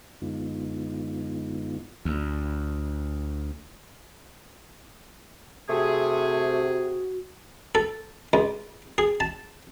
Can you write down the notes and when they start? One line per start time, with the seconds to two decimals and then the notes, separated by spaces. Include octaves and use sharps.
0.22 F#2 D3 G#3 B3 D#4 F4
2.05 D2
5.69 C3 A3 F#4 G#4
7.75 A4
8.33 C#2
8.98 G#4
9.20 A5